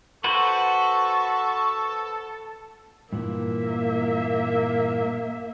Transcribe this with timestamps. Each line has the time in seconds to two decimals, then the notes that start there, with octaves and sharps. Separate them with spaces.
0.24 F#4 A4 B4 C5 C#6
3.13 G2 A#2 E3 A#3 E5